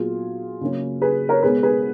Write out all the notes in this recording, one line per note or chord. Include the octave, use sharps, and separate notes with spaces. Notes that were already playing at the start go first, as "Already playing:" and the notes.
Already playing: A#2 F#3 B3 F4 G#4
C#3 F#3 A#3 C#4
G#4 B4
A#4 C#5
B2 G#3 B3 G#4 B4
G#4 B4